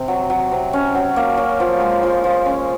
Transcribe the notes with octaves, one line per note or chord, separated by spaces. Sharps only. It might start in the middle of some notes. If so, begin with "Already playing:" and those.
Already playing: C3
F#3
F#3
C3
C#4
F#3
A#3
F#3
F3
G#3
F3
F3
C#4